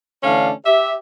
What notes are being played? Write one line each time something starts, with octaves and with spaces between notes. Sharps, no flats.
D3 E3 A3 C#4 D4 F5
G4 E5